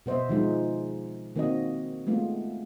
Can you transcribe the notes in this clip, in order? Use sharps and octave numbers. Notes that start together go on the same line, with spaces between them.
B2 B3 C5 D#5 E5
D#3 F3 G#3 D#4
D#3 A#3 C4 F#4 D#5
G#3 A3 B3 F4